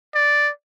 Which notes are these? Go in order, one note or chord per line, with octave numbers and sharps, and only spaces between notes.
D5